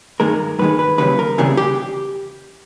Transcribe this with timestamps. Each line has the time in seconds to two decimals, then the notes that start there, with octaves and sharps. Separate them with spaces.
0.20 G2 D#3 G#3 A#4
0.59 G2 D#3 G#3 B4
0.79 B4
0.98 D#2 C#3 E3 G3 B4
1.19 A#4
1.38 D#2 C#3 E3 G3 G#4
1.57 G4